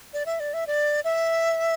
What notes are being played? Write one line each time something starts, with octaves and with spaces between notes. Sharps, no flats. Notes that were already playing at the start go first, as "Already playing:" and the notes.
D5
E5
D5
E5
D5
E5